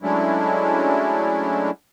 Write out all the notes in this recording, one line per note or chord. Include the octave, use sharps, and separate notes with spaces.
F#3 G#3 A3 C#4 D4 E4